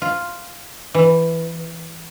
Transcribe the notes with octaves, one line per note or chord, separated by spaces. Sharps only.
F4
E3